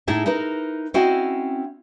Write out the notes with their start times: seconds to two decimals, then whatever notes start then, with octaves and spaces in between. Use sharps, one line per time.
0.07 A2 D#4 E4 G#4 E5 A5
0.26 D#4 E4 A#4 B4
0.94 C4 C#4 E4 F#4 D#5 G#5